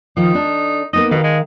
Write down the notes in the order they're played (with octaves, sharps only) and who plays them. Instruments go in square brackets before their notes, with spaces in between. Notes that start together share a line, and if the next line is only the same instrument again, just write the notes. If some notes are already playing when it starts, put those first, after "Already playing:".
[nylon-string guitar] D#3 F3 [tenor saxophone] D#4
[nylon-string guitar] D4 A4
[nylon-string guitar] A#3 B3 D#4 [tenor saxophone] D#5
[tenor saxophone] B2 [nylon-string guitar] D#3 F5
[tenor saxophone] G#3